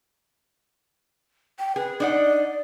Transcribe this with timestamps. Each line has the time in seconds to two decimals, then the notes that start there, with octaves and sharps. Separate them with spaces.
1.59 G5
1.76 G#4 B4
2.00 D4 D#4 D5 F#5